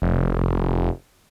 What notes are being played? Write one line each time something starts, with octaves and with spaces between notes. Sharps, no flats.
F1